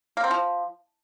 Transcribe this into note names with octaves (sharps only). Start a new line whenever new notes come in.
A#3
C4
F3